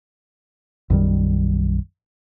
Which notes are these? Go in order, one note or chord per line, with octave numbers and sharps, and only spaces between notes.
B1 F#2 D#3 G3